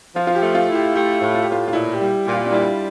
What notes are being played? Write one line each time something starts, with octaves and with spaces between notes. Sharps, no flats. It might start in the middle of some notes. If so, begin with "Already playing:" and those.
F3 F4
F4
G4
A3
F4
E4
G4
A3 G4
A2
F4
G4
A2 F4
F4
A#2 E4
G4
G3
A#2 G4
F4
D4
G3 E4